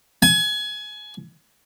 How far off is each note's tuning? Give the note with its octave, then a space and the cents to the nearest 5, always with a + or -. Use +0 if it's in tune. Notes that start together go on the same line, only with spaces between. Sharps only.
G#5 +25